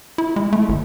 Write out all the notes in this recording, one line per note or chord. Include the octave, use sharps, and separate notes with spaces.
E4
G#3
A3
G#1